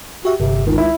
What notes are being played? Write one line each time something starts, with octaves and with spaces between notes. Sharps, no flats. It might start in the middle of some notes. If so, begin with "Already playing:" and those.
F#4 G4 E5
G1 C3
C#2 D#3
E4